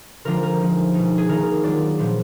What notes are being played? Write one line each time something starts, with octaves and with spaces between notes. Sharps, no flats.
D3 F3 G#3 D4 F4 A#4
A#4
F3 G#3 D#4
B2 G#3 D#4
G#4
D#3 A#3 D#4 A#4
A#4
F#3 D4 F4 D5
A#2 F3 B3 D4